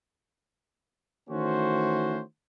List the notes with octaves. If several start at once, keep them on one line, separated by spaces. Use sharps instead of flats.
D#3 E3 A3 C#4 F#4 C5